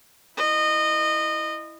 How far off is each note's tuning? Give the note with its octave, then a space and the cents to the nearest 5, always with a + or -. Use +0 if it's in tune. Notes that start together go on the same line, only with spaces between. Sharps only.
E4 +0 D#5 -20